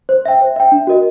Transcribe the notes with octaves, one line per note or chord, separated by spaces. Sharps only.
C5
E5 G5
C5
E5 G5
D4
F#4 A#4 D#5